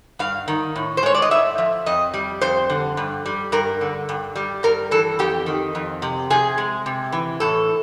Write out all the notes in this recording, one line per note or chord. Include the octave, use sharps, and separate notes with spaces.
G2 F5
D#3
A2
C5
G#3 C#5
D5
D#5
A2 E5
F3
F2 D#5
G3
F2 C5
D3
G2
G3
G2 A#4
D3
G2
G3
G2 A#4
E3 A4
F2 G4
D#3
F2
C3
C3 G#4
G#3
C3
E3
A2 A4